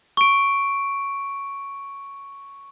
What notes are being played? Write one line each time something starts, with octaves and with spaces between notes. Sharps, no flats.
C#6 D7